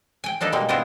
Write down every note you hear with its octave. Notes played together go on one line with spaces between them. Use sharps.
G5 G#5
A#3 D4 D#4 A4 B4
B2 G3 G#3 A#3
B3 D4 E4 F4 D#5 G5